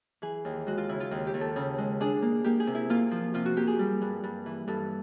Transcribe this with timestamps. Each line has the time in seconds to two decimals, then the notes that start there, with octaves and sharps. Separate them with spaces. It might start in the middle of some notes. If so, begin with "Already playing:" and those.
0.22 E3 G#4
0.45 D#2
0.67 G#3 F#4
0.78 F4
0.89 C#3 E4
1.00 F4
1.11 D#2
1.27 G4
1.34 D#2
1.41 A4
1.56 C#3
1.78 G#3
2.01 D4 G#4
2.22 A#3
2.44 A#3 G4
2.60 G#4
2.67 C3
2.75 E4
2.90 A#3 F4
3.11 F3
3.34 C3 F4
3.46 F#4
3.56 A#3 G4
3.67 G#4
3.79 G3
4.02 G2
4.23 G2
4.46 E3
4.68 G2 A4